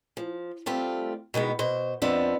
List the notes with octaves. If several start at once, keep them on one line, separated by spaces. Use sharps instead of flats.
F3
G3 A3 C4 F4
B2 D#3 G#3 B3
B2 C5
F2 F3 B3 C4 D4 E5